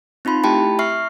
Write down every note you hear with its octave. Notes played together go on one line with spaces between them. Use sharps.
C4 D#4 F4 B5 C6
A3 E4 G4 G5 A5 B5
E5 C#6 F6 C7